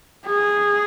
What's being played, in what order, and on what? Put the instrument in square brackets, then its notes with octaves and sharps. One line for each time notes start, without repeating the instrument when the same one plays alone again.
[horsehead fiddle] G#4